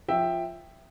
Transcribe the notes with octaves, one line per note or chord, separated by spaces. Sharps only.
F3 E5 G5